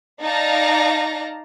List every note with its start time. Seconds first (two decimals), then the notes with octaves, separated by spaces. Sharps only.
0.22 D#4 D5 F5 A5 A#5